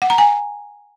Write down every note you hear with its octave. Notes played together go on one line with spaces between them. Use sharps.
F#5
A#5
G#5